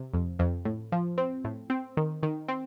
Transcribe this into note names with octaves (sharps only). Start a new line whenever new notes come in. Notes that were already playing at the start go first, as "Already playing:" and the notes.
Already playing: C3
F2
F2
A2
F3
C4
A2
C4
D#3
D#3
C4